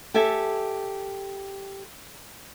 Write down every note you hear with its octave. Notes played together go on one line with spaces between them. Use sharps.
G4 A4 E5 G#5